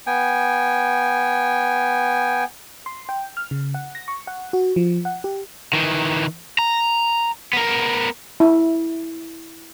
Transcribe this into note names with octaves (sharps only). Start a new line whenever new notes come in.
B3 G5 G#5
C6
G5
F6
C#3
F#5
A#6
C#6
F#5
F#4
F3
F#5
G4
D#3 E3
A#5
B3 A#4
E4